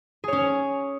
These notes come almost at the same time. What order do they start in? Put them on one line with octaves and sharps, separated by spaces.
G#4 C#5 C#4